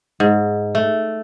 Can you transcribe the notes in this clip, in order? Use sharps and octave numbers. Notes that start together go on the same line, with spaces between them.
G#2
A3